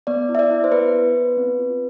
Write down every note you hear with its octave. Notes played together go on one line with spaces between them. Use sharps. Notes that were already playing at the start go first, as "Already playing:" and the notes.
B3 D5
E4
E5
D5
E4
C5
B3 B4
B3
B3
C4
F4